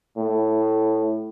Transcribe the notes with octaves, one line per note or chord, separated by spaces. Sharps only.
A2